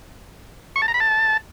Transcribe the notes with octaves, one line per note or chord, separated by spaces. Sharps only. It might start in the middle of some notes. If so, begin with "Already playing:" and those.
C#6
A5
A#5
B5
A5